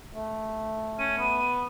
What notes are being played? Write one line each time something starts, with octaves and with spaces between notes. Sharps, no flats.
A3
C#4 D#7
B3